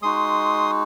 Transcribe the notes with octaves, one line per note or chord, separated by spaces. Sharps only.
G#3 D#4 F#4 C6 D#6